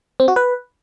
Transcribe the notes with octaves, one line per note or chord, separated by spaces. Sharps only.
C4
F#4
B4